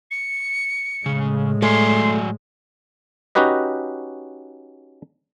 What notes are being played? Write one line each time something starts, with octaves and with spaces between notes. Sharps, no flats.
C#7
A2 C#3 G#3
F#3 A3 D5 G#5 C6
C#4 D#4 F#4 G4 B4 D#5